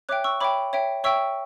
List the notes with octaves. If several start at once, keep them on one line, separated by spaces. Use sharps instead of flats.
C#5 E5 G5 D6 F#6
C#6 E6
C#5 E5 G5 B5 D6
C#5 E5 G5
C#5 E5 G5 C#6 E6